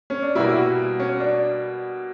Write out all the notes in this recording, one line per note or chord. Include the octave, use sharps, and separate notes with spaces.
C#4
D4
B2 G3 A#3 E4
E4
F#4
C#4
D4